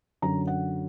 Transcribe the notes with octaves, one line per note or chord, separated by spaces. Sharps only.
F#2 D3 F#3 A#5
F#5